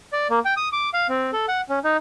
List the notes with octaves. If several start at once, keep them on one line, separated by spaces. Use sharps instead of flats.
D5
A#3
G5
D#6
D6
F5
C4
A4
F#5
C#4
D#4